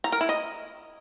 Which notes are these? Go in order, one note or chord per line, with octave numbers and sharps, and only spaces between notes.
A#5
A#4
E4
D#5